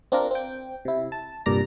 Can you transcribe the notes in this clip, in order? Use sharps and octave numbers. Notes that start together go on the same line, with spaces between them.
C4 D4 F4 A#4
C4 G5
C3 E4
A5
C2 G2 A#2 D5 A#5 A#6